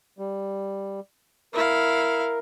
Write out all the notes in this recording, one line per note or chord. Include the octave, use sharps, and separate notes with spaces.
G3
E4 A#4 F5